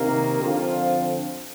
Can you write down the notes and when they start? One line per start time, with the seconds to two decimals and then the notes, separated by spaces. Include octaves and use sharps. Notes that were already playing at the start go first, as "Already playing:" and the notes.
Already playing: C3 D#3 A#3
0.40 D3 F3 C4 F4